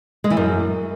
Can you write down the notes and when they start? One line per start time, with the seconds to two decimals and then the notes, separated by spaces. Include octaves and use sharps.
0.24 G#3
0.30 E3
0.37 F#2